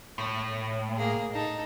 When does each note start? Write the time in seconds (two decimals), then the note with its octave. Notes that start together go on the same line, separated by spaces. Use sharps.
0.18 A2
0.98 A#3 G#4
1.33 D#4 A4